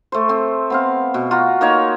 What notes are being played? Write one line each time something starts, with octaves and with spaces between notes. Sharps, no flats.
A3 C5
C4
B3 C4 F5
B2
F4 F#4 A#5
A#3 D#4 C#5